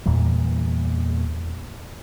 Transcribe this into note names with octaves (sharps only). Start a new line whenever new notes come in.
E2 A#2 E3 G3